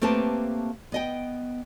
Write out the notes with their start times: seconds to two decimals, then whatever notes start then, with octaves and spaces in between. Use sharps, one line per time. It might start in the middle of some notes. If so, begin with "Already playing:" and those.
0.02 A3 A#3 C4 G4 B4 A5
0.92 B3 D#5 G5